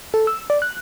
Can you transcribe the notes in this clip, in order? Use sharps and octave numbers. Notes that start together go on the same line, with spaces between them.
A4
E6
D5
F#6